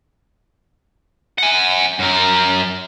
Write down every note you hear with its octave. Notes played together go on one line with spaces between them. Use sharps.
F#5 G#5
F#2 A#4